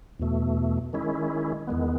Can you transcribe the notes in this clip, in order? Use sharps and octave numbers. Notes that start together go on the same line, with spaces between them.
E2 B2 A3
D#3 G#3 C#4 E4
E2 D#3 G#3 B3